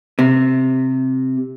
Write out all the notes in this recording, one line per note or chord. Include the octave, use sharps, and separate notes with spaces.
C3